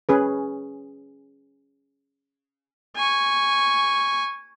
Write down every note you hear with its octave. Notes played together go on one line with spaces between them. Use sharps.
C#4 G#4 B4
G#5 C#6